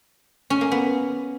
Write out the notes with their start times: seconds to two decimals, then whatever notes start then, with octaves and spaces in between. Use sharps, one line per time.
0.50 C#4
0.61 A#3
0.72 B3